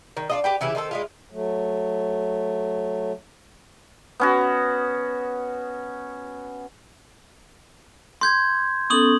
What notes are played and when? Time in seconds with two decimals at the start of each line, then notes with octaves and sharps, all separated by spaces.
0.17 D#3
0.30 D4 F4 D#5
0.44 G4 B4 G5
0.61 C#3 E3 E4 G4
0.75 D#3 C4 D4 A4
0.91 G#3 E4 F4
1.31 F#3 A3
4.20 B3 C#4 F#4
8.21 C6 G6 G#6
8.90 B3 C#4 A4 C#6 D#6 F#7